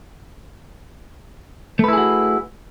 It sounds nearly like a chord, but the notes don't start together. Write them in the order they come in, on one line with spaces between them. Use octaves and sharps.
A3 B4 E4 G#4 F#4